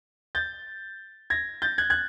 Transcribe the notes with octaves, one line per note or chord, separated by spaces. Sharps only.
G6 A6
G#6 A#6
G6 A6
F#6 G#6
F#6 G#6